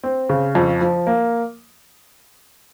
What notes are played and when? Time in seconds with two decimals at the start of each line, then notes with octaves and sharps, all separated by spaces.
0.03 C4
0.29 C#3
0.55 F2
0.81 F3
1.07 A#3